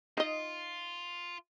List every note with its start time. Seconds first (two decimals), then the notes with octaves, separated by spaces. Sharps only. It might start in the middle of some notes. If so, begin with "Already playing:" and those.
0.17 D#4 F4 D#5